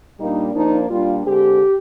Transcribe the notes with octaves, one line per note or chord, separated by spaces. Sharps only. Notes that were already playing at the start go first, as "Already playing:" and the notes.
A#2 G3 A#3 D4 D#4
F3 A#3 D4 D#4
A#2 G3 D4 F4
D3 G#3 C4 G4